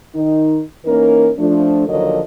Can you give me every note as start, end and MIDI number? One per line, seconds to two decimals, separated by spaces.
0.15 0.61 51
0.15 0.61 63
0.85 1.30 52
0.85 1.30 58
0.85 1.30 61
0.85 1.30 63
0.85 1.30 70
1.38 1.88 53
1.38 1.88 57
1.38 1.88 62
1.88 2.20 39
1.88 2.20 50
1.88 2.20 53
1.88 2.20 54
1.88 2.20 70
1.88 2.20 75